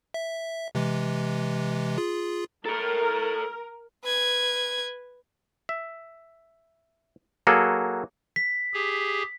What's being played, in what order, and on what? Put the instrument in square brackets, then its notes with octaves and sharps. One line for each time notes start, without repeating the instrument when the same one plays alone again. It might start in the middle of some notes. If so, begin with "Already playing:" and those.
[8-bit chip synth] E5
C3 E3 G#3
F4 G#4
[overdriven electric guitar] A4 C#5 [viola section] A#4
[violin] B4 G#6
[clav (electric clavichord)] E5
F#3 A#3 F#4 G#4 A4
[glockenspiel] B6
[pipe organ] G4 G#4